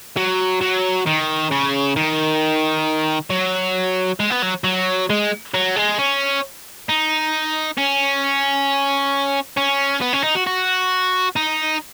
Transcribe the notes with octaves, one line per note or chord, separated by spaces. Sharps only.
F#3
F#3
D#3
C#3
D#3
F#3
G#3
B3
F#3
F#3
G#3
F#3
G#3
C#4
D#4
C#4
C#4
B3
C#4
D#4
F#4
F#4
D#4